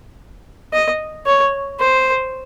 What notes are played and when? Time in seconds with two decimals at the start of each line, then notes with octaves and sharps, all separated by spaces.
0.73 D#5
1.26 C#5
1.80 C5